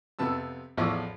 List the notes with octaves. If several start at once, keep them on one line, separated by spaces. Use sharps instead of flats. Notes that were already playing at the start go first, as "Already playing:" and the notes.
F2 C3 B3 A5 E6
A1 E2 F3 D5 C#6 E6